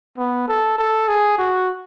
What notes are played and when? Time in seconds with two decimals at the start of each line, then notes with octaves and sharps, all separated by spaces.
0.18 B3
0.48 A4
0.78 A4
1.08 G#4
1.38 F#4